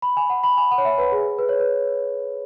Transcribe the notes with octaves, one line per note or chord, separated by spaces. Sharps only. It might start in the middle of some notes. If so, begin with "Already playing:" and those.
B5
G#5
F#5
B5
G#5
F#5
C#5
E5
B4
G#4
B4
C#5
B4